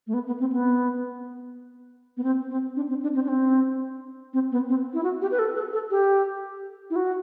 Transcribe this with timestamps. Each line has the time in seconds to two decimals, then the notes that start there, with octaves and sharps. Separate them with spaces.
0.07 A3
0.14 B3
0.27 B3
0.40 C4
0.52 B3
2.17 B3
2.23 C4
2.49 C4
2.76 D4
2.89 C4
3.02 D4
3.15 C4
3.24 D4
3.28 C4
4.34 C4
4.52 B3
4.69 C4
4.94 E4
5.03 F#4
5.22 G4
5.31 B4
5.39 A4
5.56 A4
5.73 A4
5.91 G4
6.90 E4
6.96 F#4